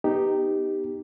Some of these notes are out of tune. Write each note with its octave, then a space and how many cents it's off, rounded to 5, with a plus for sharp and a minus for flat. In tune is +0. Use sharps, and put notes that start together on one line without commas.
B3 +0 D#4 -10 G4 +0